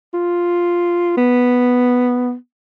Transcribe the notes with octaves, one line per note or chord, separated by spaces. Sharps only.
F4
B3